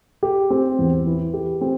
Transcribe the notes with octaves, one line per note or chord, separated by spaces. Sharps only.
G4
C4
E2
E3
G4
C4